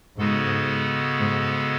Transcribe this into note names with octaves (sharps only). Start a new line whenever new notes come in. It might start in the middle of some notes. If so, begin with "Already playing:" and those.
G#2 C#3 G#3 B3 F#4 A4
G#2